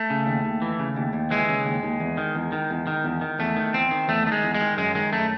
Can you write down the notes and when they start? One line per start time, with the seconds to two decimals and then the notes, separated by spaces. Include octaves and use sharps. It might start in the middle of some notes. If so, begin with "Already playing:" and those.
Already playing: A3
0.10 C#3
0.27 D#2
0.44 D#2
0.62 E3
0.79 C#3
0.97 D#2
1.13 D#2
1.31 E3 G#3
1.49 C#3
1.65 D#2
1.83 D#2
2.00 E2
2.17 D#3
2.35 E2
2.52 D#3
2.70 E2
2.87 D#3
3.04 E2
3.21 D#3
3.39 E2 A3
3.56 D#3
3.74 E2 C4
3.91 D#3
4.08 E2 A3
4.26 D#3 A3
4.32 G#3
4.43 E2
4.54 G#3
4.61 D#3
4.78 F#2 G#3
4.95 D#3 G#3
5.12 F#2 A3